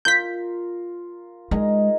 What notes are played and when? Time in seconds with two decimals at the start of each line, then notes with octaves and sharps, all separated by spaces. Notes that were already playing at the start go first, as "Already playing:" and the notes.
0.05 F4 A#4 G6 B6
1.51 G#3 D#4 G#4 A#4